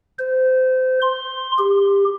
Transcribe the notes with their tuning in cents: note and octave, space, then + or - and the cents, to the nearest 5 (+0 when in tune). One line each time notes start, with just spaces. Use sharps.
C5 -25
C6 +10
G4 +25